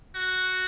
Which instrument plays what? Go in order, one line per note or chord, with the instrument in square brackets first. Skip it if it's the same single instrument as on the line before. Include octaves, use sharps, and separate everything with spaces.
[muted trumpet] F#4